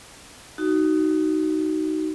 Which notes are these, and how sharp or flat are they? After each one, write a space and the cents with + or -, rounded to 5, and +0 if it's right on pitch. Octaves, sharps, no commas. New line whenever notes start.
D#4 +0 F#4 +25